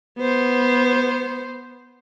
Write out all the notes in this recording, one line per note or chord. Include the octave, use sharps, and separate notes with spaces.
B3 C5